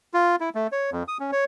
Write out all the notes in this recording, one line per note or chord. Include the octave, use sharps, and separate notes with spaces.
F4
E4
A3
C#5
F2
D#6
C#4
C#5